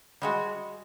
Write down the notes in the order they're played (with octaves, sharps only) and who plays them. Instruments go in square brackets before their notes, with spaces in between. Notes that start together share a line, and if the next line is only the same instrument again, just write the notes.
[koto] G3 G#3 F#4